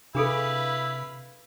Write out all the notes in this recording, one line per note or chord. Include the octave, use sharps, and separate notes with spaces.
C3 D4 E4 G#4 A4 B4 F5